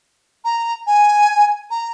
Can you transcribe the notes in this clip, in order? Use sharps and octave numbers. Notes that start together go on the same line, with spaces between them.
A#5
G#5
A#5